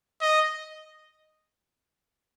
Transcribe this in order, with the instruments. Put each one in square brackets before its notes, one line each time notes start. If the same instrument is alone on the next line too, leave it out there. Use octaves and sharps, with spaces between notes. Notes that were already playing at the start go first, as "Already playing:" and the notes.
[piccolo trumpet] D#5